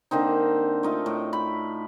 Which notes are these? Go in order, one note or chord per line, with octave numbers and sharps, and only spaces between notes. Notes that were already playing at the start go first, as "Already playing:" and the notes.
D3 A#3 C4 D#4
A3 D#4 F4
A2
B5